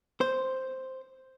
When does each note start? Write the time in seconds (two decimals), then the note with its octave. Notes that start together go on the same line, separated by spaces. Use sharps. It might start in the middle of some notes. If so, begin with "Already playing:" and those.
0.21 C5